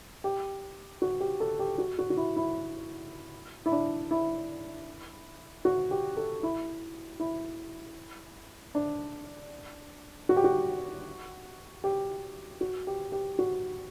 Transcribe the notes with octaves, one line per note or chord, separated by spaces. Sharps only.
G4
F#4
G4
A4
G4
F#4
F#4
F#4
E4
E4
E4
D4
E4
F#4
G4
A4
E4
E4
D4
F#4
G4
F#4
G4
F#4
G4
G4
F#4